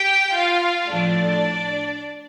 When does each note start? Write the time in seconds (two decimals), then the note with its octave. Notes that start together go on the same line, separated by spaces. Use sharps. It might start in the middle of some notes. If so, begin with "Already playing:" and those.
Already playing: G4 G5
0.35 F4 F5
0.90 A2 F3 A3 D4 D5